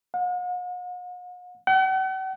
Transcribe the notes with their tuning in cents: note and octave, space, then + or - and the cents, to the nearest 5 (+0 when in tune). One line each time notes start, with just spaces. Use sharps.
F#5 -45
F#5 +45